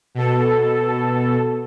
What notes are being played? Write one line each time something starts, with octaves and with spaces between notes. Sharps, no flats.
B2 A4